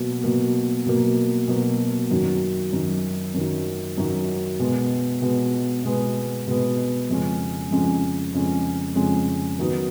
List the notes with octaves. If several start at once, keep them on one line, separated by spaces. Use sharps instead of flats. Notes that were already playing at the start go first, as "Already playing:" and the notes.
Already playing: B2 F#3 A#3
B2 F#3 A#3
B2 F#3 A#3
B2 F#3 A#3
F#2 D#3 F#3
F#2 D#3 F#3
F#2 D#3 F#3
F#2 D#3 F#3
B2 G#3 B3
B2 G#3 B3
B2 G#3 B3
B2 G#3 B3
F2 C#3 G#3 C#4
F2 C#3 G#3 C#4
F2 C#3 G#3 C#4
F2 C#3 G#3 C#4
D#3 F#3 B3 D#4